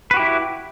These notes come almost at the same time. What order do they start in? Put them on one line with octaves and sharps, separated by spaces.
B4 F#4 G4 E4